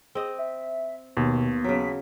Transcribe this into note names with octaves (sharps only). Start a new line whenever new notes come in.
C4 G#4 D#5
E5
D#2 B2 B3
C#3 F#3 B6